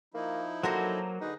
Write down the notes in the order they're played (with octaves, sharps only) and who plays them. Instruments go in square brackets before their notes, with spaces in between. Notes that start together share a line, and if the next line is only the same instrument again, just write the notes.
[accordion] F3 D#4 E4 [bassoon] A#3
[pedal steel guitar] F#3 A#4 A#5 [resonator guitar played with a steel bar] A#3 F#4 C5 [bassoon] A4
[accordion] D3 G#4 B4 [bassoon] D#4